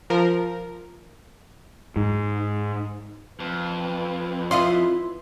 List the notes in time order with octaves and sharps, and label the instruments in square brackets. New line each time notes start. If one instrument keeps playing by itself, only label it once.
[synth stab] F3 A#4
[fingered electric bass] G#2
[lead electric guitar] F2 [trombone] B4
[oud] E4 F4 D#5 [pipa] F5 C6